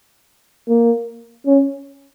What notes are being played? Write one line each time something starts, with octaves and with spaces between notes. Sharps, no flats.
A#3
C#4